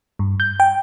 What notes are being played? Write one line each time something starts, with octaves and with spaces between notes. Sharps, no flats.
G2
G6
G5